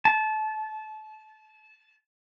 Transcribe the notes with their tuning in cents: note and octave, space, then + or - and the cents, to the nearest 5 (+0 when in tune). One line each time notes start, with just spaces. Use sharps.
A5 -25